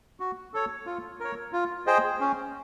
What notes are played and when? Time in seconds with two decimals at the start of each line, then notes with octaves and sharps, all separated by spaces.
0.20 F#4
0.54 A4 C#5
0.86 F4
1.20 A#4 C#5
1.53 F4
1.86 G#4 C5 D#5 G5
2.20 C#4